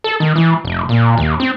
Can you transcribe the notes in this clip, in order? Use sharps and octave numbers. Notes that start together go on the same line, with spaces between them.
A4
D#3
E3
F1
A#2
D#2
C4